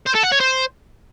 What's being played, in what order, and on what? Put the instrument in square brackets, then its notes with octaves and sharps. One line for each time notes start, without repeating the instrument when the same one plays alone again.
[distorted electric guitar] C5
A4
F#5
C#5
C5